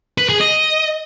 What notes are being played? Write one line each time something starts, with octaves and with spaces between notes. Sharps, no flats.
B4
G#4
D#5